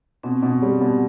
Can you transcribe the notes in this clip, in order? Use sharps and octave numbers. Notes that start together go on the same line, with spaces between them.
B2 C4
B2
G3
B2